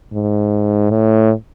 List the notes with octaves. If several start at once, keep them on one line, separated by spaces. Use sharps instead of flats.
G#2
A2